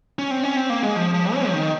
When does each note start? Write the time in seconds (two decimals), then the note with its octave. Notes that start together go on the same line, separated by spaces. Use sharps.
0.19 C#4
0.31 C4
0.44 C#4
0.56 C4
0.70 A#3
0.83 G#3
0.96 F3
1.14 F3
1.34 C#4
1.48 F3
1.53 D#3